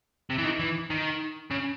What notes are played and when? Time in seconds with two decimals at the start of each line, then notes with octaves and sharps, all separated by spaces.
0.30 C3
0.38 E3
0.45 D#3
0.59 E3
0.90 D#3
1.50 C#3